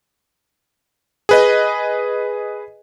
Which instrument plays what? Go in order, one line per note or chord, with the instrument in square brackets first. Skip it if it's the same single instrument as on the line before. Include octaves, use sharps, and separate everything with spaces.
[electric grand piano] G#4 B4 D#5